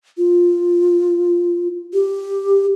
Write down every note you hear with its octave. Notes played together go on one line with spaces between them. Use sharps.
F4
G4